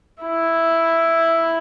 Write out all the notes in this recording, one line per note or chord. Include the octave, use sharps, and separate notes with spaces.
E4